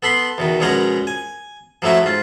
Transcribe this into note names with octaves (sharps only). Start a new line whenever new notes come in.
B3 A4 B5 C6
E2 B2 D#3
A#1 B2 G#3 C#4 F#5 A#5
G#5
F3 F#3 A3 E4 F#4
G#2 F4